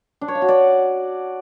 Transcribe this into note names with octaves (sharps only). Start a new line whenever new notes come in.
D4
C#5
F5
F#4
D5